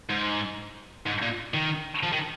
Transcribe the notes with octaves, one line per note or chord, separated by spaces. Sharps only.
G#2
G#2
A#2
D#3
F3
D#3